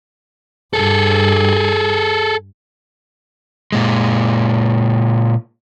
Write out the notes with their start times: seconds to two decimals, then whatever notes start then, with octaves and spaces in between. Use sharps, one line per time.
0.73 G2 G#4 A4
3.72 A#2 G#3